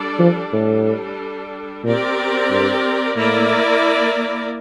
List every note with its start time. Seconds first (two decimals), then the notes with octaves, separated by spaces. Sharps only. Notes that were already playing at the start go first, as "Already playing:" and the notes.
Already playing: G3 D4 A4 D5
0.19 F3
0.53 A2 G3 D4 A4
1.84 A#2 C4 G4 A#4 D5
2.50 G2
3.15 A2 A#3 E4 A#4 D5